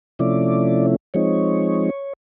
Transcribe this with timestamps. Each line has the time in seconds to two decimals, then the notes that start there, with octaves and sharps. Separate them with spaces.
0.19 C3 F3 A3 C#4 E4 D5
1.14 F3 G#3 C4 D#4 C#5